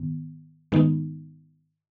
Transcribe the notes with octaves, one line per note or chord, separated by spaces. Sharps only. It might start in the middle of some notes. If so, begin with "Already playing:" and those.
Already playing: G#2 D#3 B3
G#2 D#3 G#3 B3 D#4